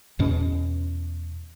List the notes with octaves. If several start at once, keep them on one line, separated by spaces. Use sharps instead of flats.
E2 B2 C#4